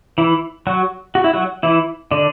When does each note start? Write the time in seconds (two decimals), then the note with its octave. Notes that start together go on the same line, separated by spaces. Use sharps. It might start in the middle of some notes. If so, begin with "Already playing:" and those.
0.18 E3 E4
0.67 F#3 F#4
1.15 F#4
1.24 E4
1.34 F#3 F#4
1.63 E3 E4
2.11 D3 D4